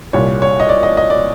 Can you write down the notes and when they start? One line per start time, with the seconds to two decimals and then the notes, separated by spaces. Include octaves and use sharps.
0.13 C2 A#2 G3 C#5
0.42 C#5
0.60 D#5
0.69 D5
0.83 D#5
0.97 D#5
1.10 D5